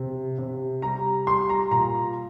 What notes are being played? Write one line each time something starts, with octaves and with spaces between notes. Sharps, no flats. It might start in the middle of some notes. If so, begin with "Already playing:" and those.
Already playing: C3
C3
G3 A#5
G3 C6
A#5
A#2 A#5